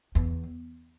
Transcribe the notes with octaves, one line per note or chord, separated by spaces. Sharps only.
E2